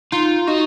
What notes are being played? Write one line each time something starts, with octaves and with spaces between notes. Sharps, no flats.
D#4 F4
D#4 F#4